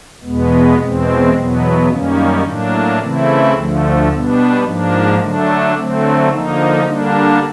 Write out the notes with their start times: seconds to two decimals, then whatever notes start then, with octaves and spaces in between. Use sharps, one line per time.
0.23 E2 B2 G#3 B3
0.78 E2 B2 G#3 C4
1.34 E2 B2 F#3 B3
1.88 F#2 D#3 G3 A#3 C#4
2.44 A2 F#3 A#3 D4
2.99 C#3 E3 A3 C4 E4
3.54 D2 D3 F3 A3
4.09 B2 G3 B3 D4
4.63 G#2 F3 A#3 D4
5.19 D3 F#3 A3 D4
5.74 D3 F#3 A3 C4
6.29 D3 F3 A#3 D#4
6.84 D3 G3 A#3 D4